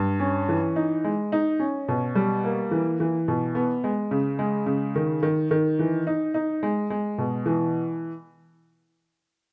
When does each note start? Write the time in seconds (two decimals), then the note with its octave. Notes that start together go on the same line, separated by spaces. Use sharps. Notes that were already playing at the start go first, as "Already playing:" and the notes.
Already playing: G2
0.20 C#4
0.49 E3
0.76 D#4
1.04 G#3
1.32 D#4
1.59 C#4
1.88 B2
2.15 G3
2.44 A#3
2.71 E3
3.00 E3
3.28 B2
3.55 B3
3.84 G#3
4.11 C#3
4.39 G#3
4.66 C#3
4.96 D#3
5.23 D#3
5.51 D#3
5.79 E3
6.07 D#4
6.34 D#4
6.63 G#3
6.90 G#3
7.18 B2
7.46 E3